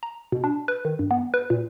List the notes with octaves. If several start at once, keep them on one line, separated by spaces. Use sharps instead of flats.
A#5
B2
D4
B4
D#3
G2
B3
B4
A#2